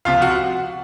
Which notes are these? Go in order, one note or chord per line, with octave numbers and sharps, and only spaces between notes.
C#2 C3 F3 F4 F5
F#4 F#5